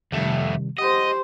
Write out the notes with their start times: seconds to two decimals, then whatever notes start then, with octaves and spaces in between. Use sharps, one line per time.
0.12 F2 C3 D#3 G3 A3
0.79 G4 C5 D#5 F#5